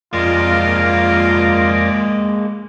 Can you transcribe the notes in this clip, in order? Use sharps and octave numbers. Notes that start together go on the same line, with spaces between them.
F2 G#3 A#3 F4 A#4 D5